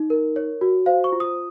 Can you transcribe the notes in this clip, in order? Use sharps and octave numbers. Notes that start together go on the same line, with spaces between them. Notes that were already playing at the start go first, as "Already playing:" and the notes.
Already playing: D#4
A#4
C#5
F#4
C5 F5
C#6
F4
D#6